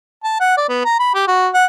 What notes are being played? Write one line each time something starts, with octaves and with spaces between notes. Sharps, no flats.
A5
F#5
D5
B3
A#5
B5
G4
F#4
F#5